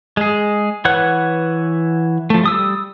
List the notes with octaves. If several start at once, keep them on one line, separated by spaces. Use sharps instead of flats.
G#3 G#4
E3 B4 C#5 F#5 F#6
F3 A3
G3 D#6 E6